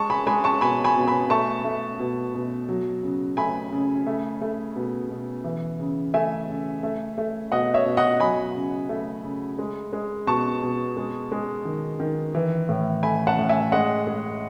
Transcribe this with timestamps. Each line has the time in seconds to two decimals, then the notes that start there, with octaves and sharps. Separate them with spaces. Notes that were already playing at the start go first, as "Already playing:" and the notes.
Already playing: G#3 A5 C#6
0.10 G#5 B5
0.27 G#3 G#5 B5
0.44 A5 C#6
0.61 B2 G#5 B5
0.84 G#5 B5
0.96 B2
1.08 G#5 B5
1.30 A3 A5 C#6
1.65 A3
1.99 B2
2.34 B2
2.69 F#3
3.03 C#3
3.37 A3 G#5 B5
3.72 C#3
4.07 A3
4.41 A3
4.76 B2
5.10 B2
5.44 E3
5.80 C#3
6.14 A3 E5 G#5
6.48 C#3
6.83 A3
7.18 A3
7.51 B2 D#5 F#5
7.74 C#5 E5
7.85 B2
7.97 D#5 F#5
8.20 F#3 G#5 B5
8.55 C#3
8.89 A3
9.23 C#3
9.58 G#3
9.93 G#3
10.27 B2 A5 C#6
10.63 B2
10.96 G#3
11.32 G#3
11.65 D#3
12.00 D#3
12.35 E3
12.69 A2
13.03 A3 G#5 B5
13.27 F#5 A5
13.39 A2
13.49 E5 G#5
13.72 G#3 D#5 F#5
14.07 G#3